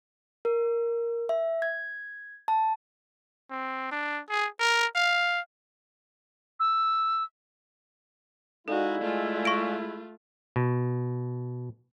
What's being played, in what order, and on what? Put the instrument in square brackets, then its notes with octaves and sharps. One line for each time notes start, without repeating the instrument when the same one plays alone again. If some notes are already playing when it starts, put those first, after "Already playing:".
[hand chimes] A#4
E5
G#6
A5
[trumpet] C4
D4
G#4
A#4
F5
[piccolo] E6
[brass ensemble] G#3 E4 [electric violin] D#4 F#4 [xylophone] A4 [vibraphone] D5 F5 G#5
[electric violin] A3 F4
[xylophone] C#6 A#6 D7
[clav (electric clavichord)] B2